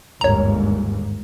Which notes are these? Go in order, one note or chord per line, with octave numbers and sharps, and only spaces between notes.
G1 D#2 G#2 C#5 A#5